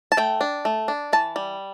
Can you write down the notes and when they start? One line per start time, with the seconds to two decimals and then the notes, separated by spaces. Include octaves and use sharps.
0.12 A5
0.17 A3 G5
0.41 D4
0.65 A3
0.88 D4
1.13 E3 A5
1.36 G3